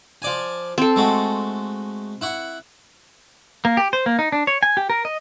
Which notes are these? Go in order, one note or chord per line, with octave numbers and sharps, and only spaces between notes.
F3 D5 G#5
C4 A4
G#3 A3 F#4
E4 F#5 C#6
A#3
G4
C5
A#3
D#4
D4
C#5
G#5
G4
A#4
D#5